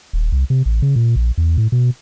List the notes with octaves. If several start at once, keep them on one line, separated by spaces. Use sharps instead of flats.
D#1
C2
C3
A1
C#3
A#2
A#1
E2
A2
B2